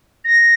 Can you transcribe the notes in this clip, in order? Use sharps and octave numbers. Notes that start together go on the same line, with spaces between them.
A#6